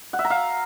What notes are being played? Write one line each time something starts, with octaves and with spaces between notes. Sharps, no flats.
F#5
E5
A#5
F5